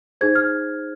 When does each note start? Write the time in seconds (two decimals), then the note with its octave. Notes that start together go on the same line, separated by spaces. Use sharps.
0.21 D#4 G#4 C5 G#6
0.35 F6